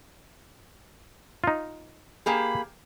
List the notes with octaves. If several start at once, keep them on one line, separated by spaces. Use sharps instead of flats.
D#4 F4
A#3 G4 G#4 B5